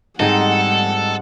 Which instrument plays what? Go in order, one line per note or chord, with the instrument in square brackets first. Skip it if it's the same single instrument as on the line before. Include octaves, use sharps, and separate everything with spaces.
[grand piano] G#2 [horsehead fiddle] G3 F#5 [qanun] C4 D#4 G#4 [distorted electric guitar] A4